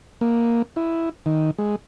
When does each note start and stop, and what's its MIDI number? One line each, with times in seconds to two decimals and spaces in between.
0.21 0.62 58
0.76 1.09 64
1.26 1.51 51
1.58 1.76 56